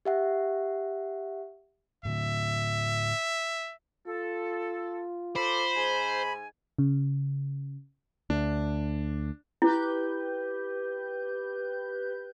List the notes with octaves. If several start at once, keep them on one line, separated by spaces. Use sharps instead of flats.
G4 E5 F#5
A2 D3 E5
F4 A4
A4 C5 B5 C6 D6
G#2 G#5
C#3
D2 D4
E4 G4 B4 G6